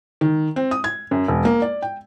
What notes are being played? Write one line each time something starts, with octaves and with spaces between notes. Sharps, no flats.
D#3
C4
D#6
G#6
F#2
E1
A#3
D5
G5